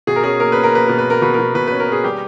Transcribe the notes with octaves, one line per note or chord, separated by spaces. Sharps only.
B2 G#4
A#4
C#4 G#4
A#3 A#4
C#4 B4
A#4
A#3 B4
B2 A#4
B4
A#3 A#4
B2 B4
B2 A#4
B2 B4
C#4 B4
A#4
C#4 G#4
G3 G4